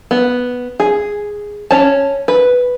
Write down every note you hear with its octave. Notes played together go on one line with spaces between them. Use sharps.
B3
G#4
C#4 C#5 A5
B4